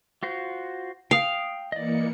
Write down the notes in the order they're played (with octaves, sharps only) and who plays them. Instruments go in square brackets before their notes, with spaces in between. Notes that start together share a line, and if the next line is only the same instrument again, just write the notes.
[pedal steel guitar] F4 F#4 C5
[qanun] F5 [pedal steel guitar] G5 D#6
[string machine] E3 A#3 C#7 [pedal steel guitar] D5 D#5